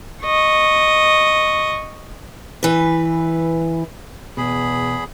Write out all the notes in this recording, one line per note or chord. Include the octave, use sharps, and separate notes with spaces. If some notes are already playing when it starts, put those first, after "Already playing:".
D#5 C#6
E3 B4
E2 B2 G#4 B5